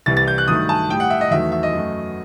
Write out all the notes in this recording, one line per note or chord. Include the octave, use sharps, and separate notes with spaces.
C2 C3 E3 G3 A6
A6
G6
F#6
G2 D#3 F#3 A3 D#6
A5
A2 G3 G5
F#5
E5
D#5
E2 D#3 F#3 A3 E5
E5
D#5
F#2 F#3 A3